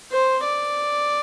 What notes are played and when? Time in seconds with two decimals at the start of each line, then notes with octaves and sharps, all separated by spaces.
0.12 C5
0.44 D5